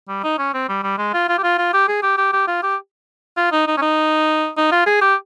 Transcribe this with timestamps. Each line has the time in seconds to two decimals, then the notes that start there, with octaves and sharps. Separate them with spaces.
0.09 G3
0.24 D#4
0.38 C#4
0.54 C4
0.69 G3
0.83 G3
0.98 G#3
1.14 F4
1.29 F4
1.38 G4
1.44 F4
1.58 F4
1.74 G4
1.88 G#4
2.03 G4
2.18 G4
2.33 G4
2.48 F4
2.63 G4
3.37 F4
3.52 D#4
3.67 D#4
3.77 C#4
3.82 D#4
4.57 D#4
4.72 F4
4.87 G#4
5.02 G4